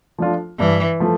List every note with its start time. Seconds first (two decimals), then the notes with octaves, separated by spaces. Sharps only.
0.18 F3 A3 D4 F4
0.59 G2 E3
1.00 F3 A3